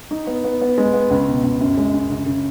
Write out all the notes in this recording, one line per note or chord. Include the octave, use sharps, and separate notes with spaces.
D#4
B3
B3
B3
G#3
B3
C#2
B2
C#2
F#2
G#3
F#2
C#3
C#3